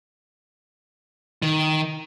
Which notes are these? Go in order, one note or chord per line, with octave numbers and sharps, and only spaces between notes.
D#3